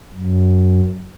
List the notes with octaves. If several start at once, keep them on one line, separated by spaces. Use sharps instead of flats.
F#2